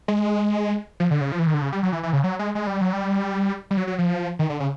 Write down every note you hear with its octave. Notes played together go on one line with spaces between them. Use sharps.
G#3
F3
D3
C#3
F3
E3
D#3
D3
C#3
G3
F#3
E3
E3
C#3
F#3
G#3
G#3
G3
F#3
G3
G3
F#3
F#3
F3
D#3
D3
C#3